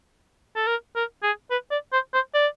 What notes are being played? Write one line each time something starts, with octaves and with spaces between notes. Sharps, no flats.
A4
A#4
A#4
G#4
B4
D5
C5
C5
D5